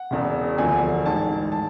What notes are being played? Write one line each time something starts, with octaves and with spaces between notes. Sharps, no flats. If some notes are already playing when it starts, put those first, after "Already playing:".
Already playing: F#5
E1 E2 C#3
E1 D2 D3 F3 G#5
A1 G#2 D#3 A5
A5